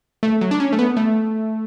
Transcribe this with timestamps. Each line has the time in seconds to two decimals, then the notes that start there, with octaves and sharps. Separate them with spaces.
0.23 A3
0.41 F#3
0.51 D4
0.60 C#4
0.72 A3
0.79 B3
0.97 A3